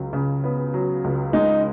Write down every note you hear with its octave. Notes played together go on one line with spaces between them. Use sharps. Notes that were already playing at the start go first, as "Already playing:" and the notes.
Already playing: C#2 F#3
C#3
B3
F#3
C#2
G#3 D#4